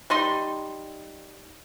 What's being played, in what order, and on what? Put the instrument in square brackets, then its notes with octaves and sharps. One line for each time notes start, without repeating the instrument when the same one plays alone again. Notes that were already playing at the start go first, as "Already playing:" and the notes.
[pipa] G3 D#4 C6